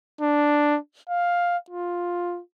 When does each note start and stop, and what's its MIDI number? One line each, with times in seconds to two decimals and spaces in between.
0.21 0.77 62
1.09 1.57 77
1.70 2.40 65